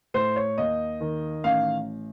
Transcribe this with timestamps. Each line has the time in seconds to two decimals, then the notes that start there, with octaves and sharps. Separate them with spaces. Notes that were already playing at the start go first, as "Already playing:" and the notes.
0.14 A2 C5
0.36 C#5
0.58 D#2 D#5
1.01 D#3
1.44 A1 F5